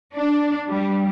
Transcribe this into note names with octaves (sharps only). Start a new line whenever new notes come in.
D4
G3